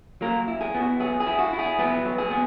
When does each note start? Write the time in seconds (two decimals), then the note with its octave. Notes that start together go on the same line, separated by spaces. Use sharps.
0.21 F#3 A#3 A#4
0.48 E4
0.61 G#4
0.74 B3
0.80 F#4
1.00 F#3 G#4
1.20 G#4
1.26 E4
1.39 F#4
1.53 E4
1.59 G#4
1.78 F#3 B3 B4
2.05 F#3
2.18 G#4
2.30 B3